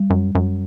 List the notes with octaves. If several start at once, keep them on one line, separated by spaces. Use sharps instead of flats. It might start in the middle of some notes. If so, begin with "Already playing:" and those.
Already playing: G3
F#2
F#2